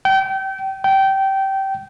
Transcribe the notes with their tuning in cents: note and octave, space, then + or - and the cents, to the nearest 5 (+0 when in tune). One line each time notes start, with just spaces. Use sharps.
G5 -30
G5 -20